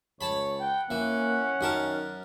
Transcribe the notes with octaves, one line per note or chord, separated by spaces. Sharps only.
C#2 C#5 A5 B5
F#5 G5
E3 A#3 C#4
F#2 D#3 A#4 A5